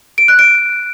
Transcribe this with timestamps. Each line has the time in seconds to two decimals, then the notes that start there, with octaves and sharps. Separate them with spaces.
0.18 D7
0.28 F#6
0.39 D7